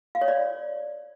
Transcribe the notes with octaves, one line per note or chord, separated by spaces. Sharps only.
F5
C#5
D5